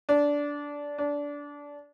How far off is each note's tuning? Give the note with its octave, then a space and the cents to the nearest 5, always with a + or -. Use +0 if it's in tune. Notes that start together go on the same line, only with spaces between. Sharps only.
D4 -15
D4 -20